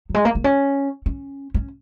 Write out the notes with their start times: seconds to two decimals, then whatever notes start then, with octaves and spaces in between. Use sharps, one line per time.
0.09 F#3
0.14 G#3
0.25 A#3
0.35 A#3
0.44 C#4
1.06 C#4
1.54 C#4